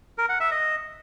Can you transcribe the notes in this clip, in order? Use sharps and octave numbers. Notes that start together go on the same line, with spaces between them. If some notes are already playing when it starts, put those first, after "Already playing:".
A#4
F#5
E5
D#5